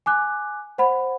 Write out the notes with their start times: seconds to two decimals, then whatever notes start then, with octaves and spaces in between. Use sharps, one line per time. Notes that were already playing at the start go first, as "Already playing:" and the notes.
0.06 G#5 D6 F#6
0.78 C5 F#5 B5